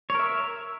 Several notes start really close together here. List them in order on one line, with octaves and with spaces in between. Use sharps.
C#5 A#4 E5